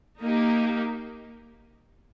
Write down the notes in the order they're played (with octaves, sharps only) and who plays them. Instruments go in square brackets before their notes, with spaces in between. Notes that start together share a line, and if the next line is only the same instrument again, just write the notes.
[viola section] A#3 D#4 G4